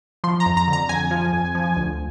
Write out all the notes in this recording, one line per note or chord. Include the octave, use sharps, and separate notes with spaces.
F3 C6
A#5
F2
A#5
D3
A#5
F2 G#5
F3
F2
F3
D2